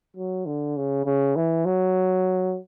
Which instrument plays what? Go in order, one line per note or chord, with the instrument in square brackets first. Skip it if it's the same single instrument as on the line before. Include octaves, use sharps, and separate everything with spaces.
[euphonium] F#3
D3
C#3
C#3
E3
F#3